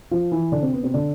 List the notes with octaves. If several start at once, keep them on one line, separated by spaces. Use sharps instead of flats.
F3 F4
E3 E4
D3 D4
C3 C4
B3
C3 C4
D3 D4